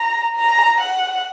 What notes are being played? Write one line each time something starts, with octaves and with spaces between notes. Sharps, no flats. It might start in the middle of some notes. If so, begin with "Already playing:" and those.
Already playing: A#5
A#5
F#5